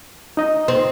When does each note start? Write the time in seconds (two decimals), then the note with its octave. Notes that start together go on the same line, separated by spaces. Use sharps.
0.37 D#4 D#5
0.68 C4